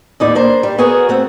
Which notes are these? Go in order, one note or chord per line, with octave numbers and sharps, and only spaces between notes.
D#2 A2 D#4 E4 D5
A#3 D4 C5
G3
B3 F#4 G#4 A#4 C#5
A3 C4 F#5